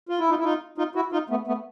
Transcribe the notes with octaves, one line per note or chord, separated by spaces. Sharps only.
F4
E4
D#4 F4
E4
D#4 F4
D#4 F4
E4 F#4
D#4 F4
A3 B3
A3 B3